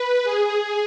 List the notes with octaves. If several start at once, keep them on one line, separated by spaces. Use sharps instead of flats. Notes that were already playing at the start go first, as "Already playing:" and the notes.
Already playing: B4
G#4